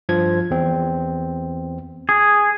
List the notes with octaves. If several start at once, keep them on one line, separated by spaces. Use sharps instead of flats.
G2 F3 G#6
E2 C4
G#4